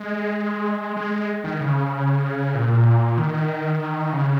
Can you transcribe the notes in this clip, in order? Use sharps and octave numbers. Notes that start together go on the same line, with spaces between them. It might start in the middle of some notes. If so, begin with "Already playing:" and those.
Already playing: G#3
G#3
D#3
C#3
A#2
D#3
C#3